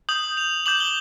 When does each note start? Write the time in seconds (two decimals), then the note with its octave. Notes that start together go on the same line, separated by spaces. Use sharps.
0.09 D#6 G6 F#7
0.37 F7
0.66 D6 G6 F#7
0.80 G7